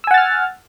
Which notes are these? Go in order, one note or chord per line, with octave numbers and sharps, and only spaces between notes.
F#5 G#5 E6 F6 A6